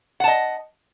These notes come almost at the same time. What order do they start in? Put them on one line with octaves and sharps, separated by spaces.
F#5 A5 D#5